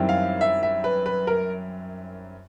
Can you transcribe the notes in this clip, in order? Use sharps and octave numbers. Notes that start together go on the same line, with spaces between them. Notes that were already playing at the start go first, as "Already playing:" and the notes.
Already playing: F#2 D#3 G3 C4 E4
F5
E5
E5
B4
B4
A#4